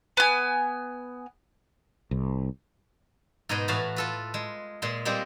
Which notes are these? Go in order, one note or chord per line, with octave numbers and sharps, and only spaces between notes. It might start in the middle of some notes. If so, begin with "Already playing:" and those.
B3 G#5
C2
G#2 B2 D#4 G#4 B4 D#5
A2 E3 F#4 B4 F5 A5
F4 A4 B4
G#3
A#2 G#3 C6
G3 G#3 A#3 C4 G4